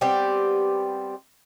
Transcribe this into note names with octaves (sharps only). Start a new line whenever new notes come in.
G3 B3 C4 G4